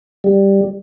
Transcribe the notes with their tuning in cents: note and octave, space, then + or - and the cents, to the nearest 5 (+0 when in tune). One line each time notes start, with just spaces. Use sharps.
G3 +5